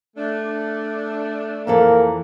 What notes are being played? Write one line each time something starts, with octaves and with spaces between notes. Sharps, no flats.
A3 D4
F2 E3 A#3 A4